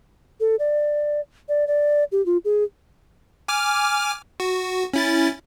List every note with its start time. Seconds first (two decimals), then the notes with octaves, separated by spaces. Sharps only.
0.40 A4
0.59 D5
1.49 D5
1.67 D5
2.12 G4
2.26 F4
2.45 G#4
3.48 G#5 D6 F6
4.40 F#4
4.93 C#4 E4 A6